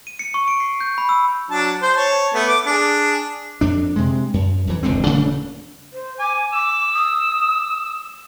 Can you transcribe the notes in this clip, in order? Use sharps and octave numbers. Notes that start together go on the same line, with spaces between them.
D#7
C#7
C#6
D7
C7
G6
B5
E6
F#3 D4 A5
C5
C#5 A5
A3 B3
D6
D4 G#4
F2 D4
C3 G#3
F#2
F2 E3
E1 C#2 D3 C4
D#1 C#3 A3 D4
C5
G#5 D6
D6 E6
D#6